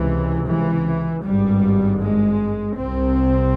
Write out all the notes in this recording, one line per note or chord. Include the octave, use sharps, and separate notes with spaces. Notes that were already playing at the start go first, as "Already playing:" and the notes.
Already playing: C#2 C3 E3
E3
G#1 G2 G3
G#3
C2 C3 C4